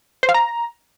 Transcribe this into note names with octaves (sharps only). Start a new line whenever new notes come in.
C5
F5
A#5